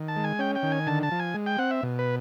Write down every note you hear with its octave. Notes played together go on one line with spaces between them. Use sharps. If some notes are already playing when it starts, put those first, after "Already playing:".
Already playing: D#3
A5
G#3
G#5
C#4 G5
G5
D#3
G#5
D3 A5
A5
F3
G#5
G#3
G5
C4 F#5
E5
B2
B4